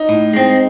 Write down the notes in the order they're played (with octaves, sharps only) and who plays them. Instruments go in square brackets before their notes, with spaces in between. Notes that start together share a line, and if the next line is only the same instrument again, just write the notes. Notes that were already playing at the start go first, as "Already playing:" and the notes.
Already playing: [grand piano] D#4
[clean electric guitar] A2
G#3 C4